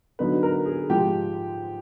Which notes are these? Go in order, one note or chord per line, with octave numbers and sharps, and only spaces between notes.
D3 F#3 B3 D#4 B4
A#4
G#4
G#2 F3 G#3 G4